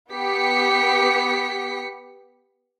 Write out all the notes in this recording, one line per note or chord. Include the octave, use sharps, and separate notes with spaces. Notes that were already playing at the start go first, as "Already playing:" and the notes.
B3 G4 B6 C#7